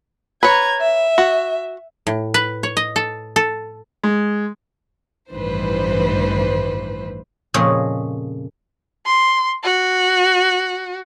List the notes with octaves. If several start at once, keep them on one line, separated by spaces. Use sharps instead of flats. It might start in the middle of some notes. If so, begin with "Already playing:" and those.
B4 C#5 A#5 G#6
E5
F#4
A2
B4
C#5
D#5
A4
A4
G#3
A1 G2 D#3 E3 B4 C5
F2 A#2 C#3 G#4 C#5 D#5
C6
F#4